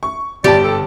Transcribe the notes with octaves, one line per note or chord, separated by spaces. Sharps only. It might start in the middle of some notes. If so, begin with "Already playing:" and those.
C#6
G1 G4 D5 A5
A4